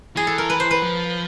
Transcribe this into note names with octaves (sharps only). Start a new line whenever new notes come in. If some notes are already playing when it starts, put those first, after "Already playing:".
E3 G#4
A4
A#4
B4
C5
B4
F3